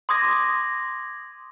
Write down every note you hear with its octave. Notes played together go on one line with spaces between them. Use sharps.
C6 D6 D#6 G#6 A#6